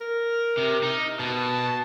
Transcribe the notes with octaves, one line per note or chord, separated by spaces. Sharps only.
A#4
C3
D#4
B2 A5